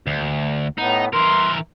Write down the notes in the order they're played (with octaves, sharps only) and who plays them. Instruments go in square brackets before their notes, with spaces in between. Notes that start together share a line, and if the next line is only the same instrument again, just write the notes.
[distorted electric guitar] D2
[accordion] A2 B3 [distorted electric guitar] D#4
[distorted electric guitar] E3 A#4 [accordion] C6